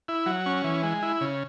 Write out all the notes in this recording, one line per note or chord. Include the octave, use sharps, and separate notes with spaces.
E4
F#3
C#4
E3
G#3
E4
C#3